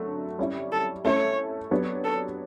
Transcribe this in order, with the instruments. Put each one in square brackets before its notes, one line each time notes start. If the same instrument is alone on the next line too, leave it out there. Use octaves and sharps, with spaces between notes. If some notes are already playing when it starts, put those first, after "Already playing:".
Already playing: [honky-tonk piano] D3 F#3 A3
G3 C#4 E4
[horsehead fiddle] A4
[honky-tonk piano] A3 C#4 E4 A4 [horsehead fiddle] C#5
[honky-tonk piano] F#3 B3 D4 G4 C#5
[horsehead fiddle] A4